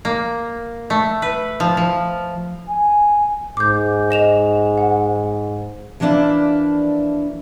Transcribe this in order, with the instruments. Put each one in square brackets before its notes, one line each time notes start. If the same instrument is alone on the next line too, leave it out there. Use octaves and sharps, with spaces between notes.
[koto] A#3
A3
B4
F3
F3
[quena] G#5
[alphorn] G#2 [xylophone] D6 G6
[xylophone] D#5 E7 F7
F#5
[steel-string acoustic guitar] E3 F3 A#3 D4 E4 D5